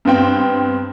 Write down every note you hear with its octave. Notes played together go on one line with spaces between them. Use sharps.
G2 B3 C4 G5